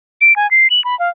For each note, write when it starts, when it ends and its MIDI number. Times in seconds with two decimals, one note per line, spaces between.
0.21 0.36 98
0.36 0.50 80
0.51 0.68 96
0.70 0.83 102
0.84 0.98 83
0.99 1.10 77